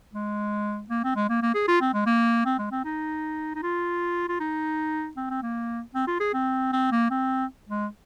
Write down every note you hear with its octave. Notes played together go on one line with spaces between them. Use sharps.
G#3
A#3
C4
G#3
A#3
A#3
G#4
F4
C4
G#3
A#3
C4
G#3
C4
D#4
D#4
F4
F4
D#4
C4
C4
A#3
C4
F4
G#4
C4
C4
A#3
C4
G#3